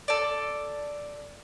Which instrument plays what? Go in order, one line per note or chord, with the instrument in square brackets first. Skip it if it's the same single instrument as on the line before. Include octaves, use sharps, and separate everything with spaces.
[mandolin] A4 D5